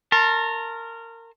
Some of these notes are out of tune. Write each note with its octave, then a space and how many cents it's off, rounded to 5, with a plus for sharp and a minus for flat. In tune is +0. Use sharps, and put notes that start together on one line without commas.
A#4 -20 A5 +0 C6 +45